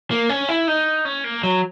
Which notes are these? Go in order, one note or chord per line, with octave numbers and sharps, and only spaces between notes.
A#3
C#4
E4
D#4
C#4
A#3
F#3